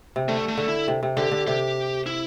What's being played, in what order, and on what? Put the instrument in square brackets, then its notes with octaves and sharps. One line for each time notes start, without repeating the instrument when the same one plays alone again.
[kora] C3
[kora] D3 [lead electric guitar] A3
[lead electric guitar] A3
[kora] D3
[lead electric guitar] E4
[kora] C3
C3
[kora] D3 [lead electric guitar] G4
[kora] D3
[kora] C3 [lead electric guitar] G4
[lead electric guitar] E4